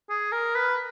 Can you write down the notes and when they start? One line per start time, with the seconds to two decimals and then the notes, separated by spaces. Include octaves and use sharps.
0.09 G#4
0.32 A#4
0.55 B4